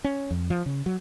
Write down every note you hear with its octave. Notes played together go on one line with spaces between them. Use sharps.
C#4
F2
F3
C#3
F#3